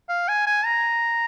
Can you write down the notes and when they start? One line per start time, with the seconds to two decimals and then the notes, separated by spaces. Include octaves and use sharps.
0.09 F5
0.29 G#5
0.47 G#5
0.66 A#5